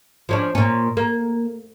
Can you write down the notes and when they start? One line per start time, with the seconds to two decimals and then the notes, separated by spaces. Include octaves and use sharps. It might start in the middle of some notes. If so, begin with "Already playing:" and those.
0.29 F3 C#4 D4
0.55 A#2 C#4
0.97 A#3